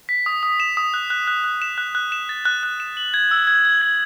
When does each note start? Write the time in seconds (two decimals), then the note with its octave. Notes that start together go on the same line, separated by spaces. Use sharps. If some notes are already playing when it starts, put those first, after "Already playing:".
0.09 B6
0.26 D#6
0.43 D#6
0.60 E7
0.77 D#6
0.94 F#6
1.10 F#6
1.27 F#6
1.44 F#6
1.62 E7
1.78 F#6
1.95 F#6
2.12 E7
2.29 A6
2.45 F#6
2.63 F#6
2.80 E7
2.97 F#7
3.14 G#6
3.31 E6
3.47 G#6
3.65 G#6
3.81 G#6